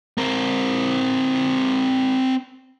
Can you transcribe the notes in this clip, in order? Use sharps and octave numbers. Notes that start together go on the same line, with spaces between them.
C4 A#4